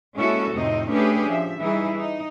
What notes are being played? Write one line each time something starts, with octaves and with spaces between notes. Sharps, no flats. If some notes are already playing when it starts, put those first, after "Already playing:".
G#3 A#3 C#4 E4 F#4 A4
F2 A2 C3 C4 D#4 D#5
A3 C#4 D4 G4 G#4 B4
F3 E5
E3 G3 D#4 E4 G#4
D#4